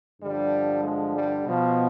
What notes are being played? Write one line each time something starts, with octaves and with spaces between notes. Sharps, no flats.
G2 D3 F3 G3
G#3
G3
B2 F3